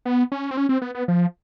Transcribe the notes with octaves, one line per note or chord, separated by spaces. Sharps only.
B3
C#4
C4
C#4
C4
B3
B3
F3